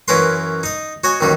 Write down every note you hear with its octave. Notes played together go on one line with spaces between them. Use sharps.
F#2 E3 C#4 A#4 B4 C6
D#4 D#5
F#4 C#5 D#5 G#5
A1 D#2 D#3 F#3 G3